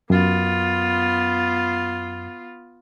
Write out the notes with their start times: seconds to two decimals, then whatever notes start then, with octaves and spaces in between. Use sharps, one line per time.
0.10 F#2 B3 F4